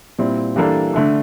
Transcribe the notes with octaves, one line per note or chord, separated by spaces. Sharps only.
A#2 G3 C4 E4
E3 G3 A#3 D4 A4
D3 A3 D4